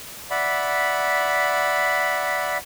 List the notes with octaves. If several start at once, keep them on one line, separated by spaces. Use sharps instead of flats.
D5 E5 F#5 B5